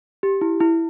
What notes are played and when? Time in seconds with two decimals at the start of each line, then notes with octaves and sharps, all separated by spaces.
0.23 G4
0.41 E4
0.61 E4